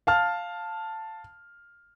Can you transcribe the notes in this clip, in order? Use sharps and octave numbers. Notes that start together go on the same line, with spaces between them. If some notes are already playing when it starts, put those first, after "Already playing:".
F5 A5 F6